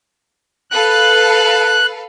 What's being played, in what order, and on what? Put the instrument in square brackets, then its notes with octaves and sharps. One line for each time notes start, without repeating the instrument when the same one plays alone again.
[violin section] A4 B4 F5 [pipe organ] F#6